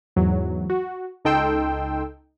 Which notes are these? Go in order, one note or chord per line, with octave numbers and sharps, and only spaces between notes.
E2 G#2 F#3
F#4
C#2 D#4 A4 G5 C6 E6